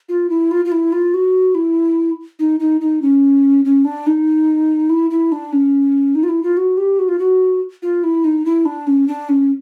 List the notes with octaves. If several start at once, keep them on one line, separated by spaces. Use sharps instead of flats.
F4
E4
F4
F4
E4
F4
F#4
E4
D#4
D#4
D#4
C#4
C#4
D4
D#4
E4
E4
D4
C#4
D#4
F4
E4
F4
F#4
G4
F#4
F4
F#4
F4
E4
D#4
E4
D4
C#4
D4
C#4